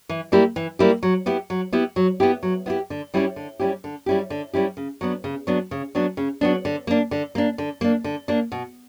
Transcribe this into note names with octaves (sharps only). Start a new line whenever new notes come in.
E3
G3 A#3 E4 G4
E3
G3 A#3 E4 G4
F#3
B3 E4 G4
F#3
B3 E4 G4
F#3
B3 E4 G4
F#3
B3 E4 G4
D3
G3 C#4 E4 G4
D3
G3 C#4 E4 G4
D3
G3 C#4 E4 G4
D3
G3 C#4 E4 G4
C#3
F#3 B3 D4
C#3
F#3 B3 D4
C#3
F#3 B3 D4
C#3
F#3 B3 D4
D3
A#3 D4
D3
A#3 D4
D3
A#3 D4
D3
A#3 D4
B2